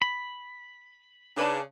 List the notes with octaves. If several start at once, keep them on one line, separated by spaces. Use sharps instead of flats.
B5
C#3 D4 D#4 B4 A5